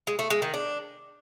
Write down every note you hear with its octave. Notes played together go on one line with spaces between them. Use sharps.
G#3
A3
G#3
D#3
D4